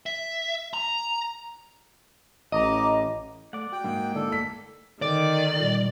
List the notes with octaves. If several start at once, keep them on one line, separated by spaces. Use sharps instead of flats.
E5
A#5
A1 D#5 A#5 D6
A3 D5 F#5
F#4 G5
G#2 A#3
D3 E4 A4 D5
A3 B6
D3 D#3 D5
A#2 G3